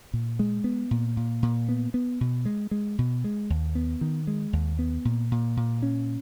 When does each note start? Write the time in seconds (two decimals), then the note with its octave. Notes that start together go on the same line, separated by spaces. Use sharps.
0.14 A#2
0.39 G#3
0.64 B3
0.91 A#2
1.17 A#2
1.43 A#2
1.69 B3
1.94 B3
2.21 B2
2.45 G#3
2.71 G#3
2.98 B2
3.24 G#3
3.50 D#2
3.75 B3
4.01 D#3
4.27 G#3
4.53 D#2
4.79 B3
5.05 A#2
5.31 A#2
5.57 A#2
5.82 C#4